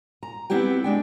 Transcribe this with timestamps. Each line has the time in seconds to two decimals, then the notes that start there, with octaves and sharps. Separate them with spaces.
0.23 A#5
0.50 B3 C4 E4 G4 G5
0.84 G#3 D4 G5